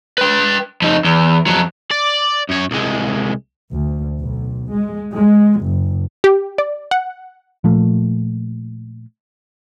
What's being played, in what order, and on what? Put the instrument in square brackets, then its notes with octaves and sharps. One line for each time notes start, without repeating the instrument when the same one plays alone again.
[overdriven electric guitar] B4 G5
F2 D#4
E2
F2 F#3
D5
F#2 C#5
C2 G#3
[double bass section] D2
B1
G#3
G#3
F#1
[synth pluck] G4
D5
F#5
[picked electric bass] A#2 F3 A3